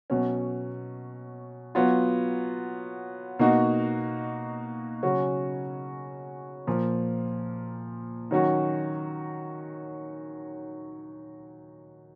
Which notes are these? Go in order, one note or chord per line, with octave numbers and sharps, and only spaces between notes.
B2 F#3 C#4
F#3 B3 F4
B2 A#3 D#4 F#4
C#3 F#3 C#4 F#4
A#2 F3 A#3
D#3 F#3 C#4 F#4